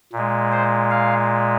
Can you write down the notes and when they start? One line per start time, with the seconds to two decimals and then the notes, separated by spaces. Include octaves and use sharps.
0.13 A#2 G#3
0.52 C5
0.90 F5